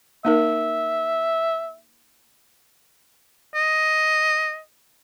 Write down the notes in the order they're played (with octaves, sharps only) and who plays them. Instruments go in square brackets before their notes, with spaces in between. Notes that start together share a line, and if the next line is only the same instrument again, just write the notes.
[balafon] A#3 D#4 A#4 [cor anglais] E5
[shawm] D#5